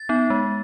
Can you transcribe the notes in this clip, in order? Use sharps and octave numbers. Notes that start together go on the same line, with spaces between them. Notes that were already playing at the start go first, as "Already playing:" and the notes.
Already playing: A6
B3 D#4
G#3